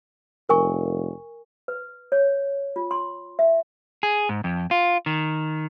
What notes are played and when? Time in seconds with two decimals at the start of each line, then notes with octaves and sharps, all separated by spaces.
0.49 F1 A#4 G#5 C#6
1.68 B4
2.12 C#5
2.76 F4
2.91 C6
3.39 E5
4.03 G#4
4.29 G#2
4.44 F2
4.71 F4
5.06 D#3